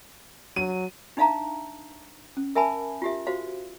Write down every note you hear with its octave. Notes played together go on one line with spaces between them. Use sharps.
F#3 D#7
D4 D#4 E5 F5 A5 A#5
C#4
A#4 E5 G#5 A5 B5
F4 G4 E5
F#4 C5 F5